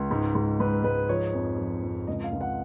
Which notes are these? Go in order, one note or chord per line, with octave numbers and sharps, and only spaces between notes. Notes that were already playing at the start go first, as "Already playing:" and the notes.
Already playing: C#2
G#2
G#2
G#2 B4
G#2 B4
F3 C#5
F2
F3
F2
C#2 D#5
F5
C#2
F#5